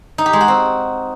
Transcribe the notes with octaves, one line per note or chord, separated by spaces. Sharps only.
D#4
G4
G#3
F#4
C4